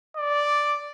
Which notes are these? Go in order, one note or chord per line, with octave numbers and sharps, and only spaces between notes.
D5